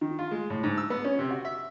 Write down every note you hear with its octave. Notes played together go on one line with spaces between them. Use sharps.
D#3
F4
G#3
A2
G#2
E6
B3
C#4
C3
F#4
E5